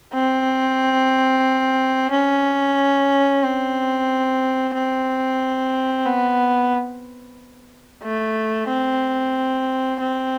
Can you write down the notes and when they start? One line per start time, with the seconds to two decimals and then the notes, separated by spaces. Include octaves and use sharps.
0.14 C4
2.11 C#4
3.43 C4
4.74 C4
6.06 B3
8.04 A3
8.69 C4
10.01 C4